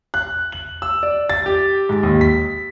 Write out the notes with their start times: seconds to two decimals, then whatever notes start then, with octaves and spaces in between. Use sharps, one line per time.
0.14 F#6
0.52 F#7
0.82 E6
1.03 D5
1.30 A6
1.46 G4
1.89 G#2
2.03 D#2
2.21 B6